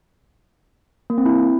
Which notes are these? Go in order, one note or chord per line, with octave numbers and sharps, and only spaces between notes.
A#3
C4
E4